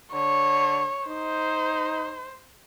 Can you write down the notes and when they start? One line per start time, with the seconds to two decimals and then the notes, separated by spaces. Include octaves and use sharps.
0.13 D3 C#5
1.07 D#4 C5